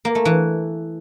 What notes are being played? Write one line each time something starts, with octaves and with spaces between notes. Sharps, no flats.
A#3
A3
E3